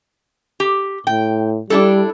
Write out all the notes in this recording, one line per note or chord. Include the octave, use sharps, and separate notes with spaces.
G4
A2 G5
G3 D4 E4 A4